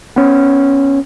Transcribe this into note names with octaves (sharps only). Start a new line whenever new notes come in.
B3 C#4